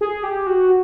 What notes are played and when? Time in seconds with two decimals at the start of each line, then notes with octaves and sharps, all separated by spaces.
0.01 G#4
0.23 G4
0.47 F#4